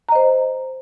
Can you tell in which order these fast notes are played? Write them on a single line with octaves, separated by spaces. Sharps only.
A#5 D#5 C5